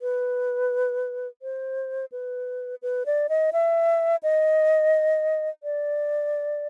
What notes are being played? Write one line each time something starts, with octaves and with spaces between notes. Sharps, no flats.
B4
C5
B4
B4
D5
D#5
E5
D#5
D5